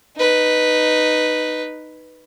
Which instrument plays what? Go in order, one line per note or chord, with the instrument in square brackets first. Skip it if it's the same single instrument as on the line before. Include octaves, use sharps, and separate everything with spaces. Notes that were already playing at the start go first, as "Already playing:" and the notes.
[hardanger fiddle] D#4 B4